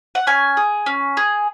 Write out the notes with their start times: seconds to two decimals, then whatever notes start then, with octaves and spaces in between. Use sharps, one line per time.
0.15 F#5
0.27 C#4 G#5
0.57 G#4
0.86 C#4
1.17 G#4